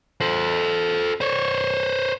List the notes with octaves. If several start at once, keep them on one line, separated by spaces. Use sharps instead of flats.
A4 C5
C5 C#5